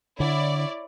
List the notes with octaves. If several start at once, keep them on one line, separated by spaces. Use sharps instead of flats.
D3 E4 C#5 D5